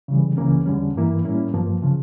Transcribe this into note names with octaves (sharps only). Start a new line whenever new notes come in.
C#3 E3 G3
C#2 C#3 E3 A#3 C#4
E2 D3 G3 C#4
G2 E3 A#3 E4
A2 G3 A#3 C#4 E4
G2 F3 A#3
C#3 F3